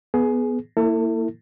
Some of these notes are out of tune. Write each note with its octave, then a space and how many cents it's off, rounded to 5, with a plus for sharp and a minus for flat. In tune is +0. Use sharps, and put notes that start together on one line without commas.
B3 +0 G#4 +20
A#3 -20 E4 +0 A4 +35